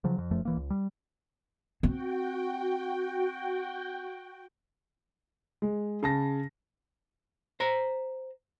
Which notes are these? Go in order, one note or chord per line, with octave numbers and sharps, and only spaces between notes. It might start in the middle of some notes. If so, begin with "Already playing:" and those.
C#3 F3 F#3
F2
F1 F#2 F3 A3
D1 E3 A#3
C#2
G3
C4 F#4 G5
G#3
C#3 A5 A#6
C5 A#5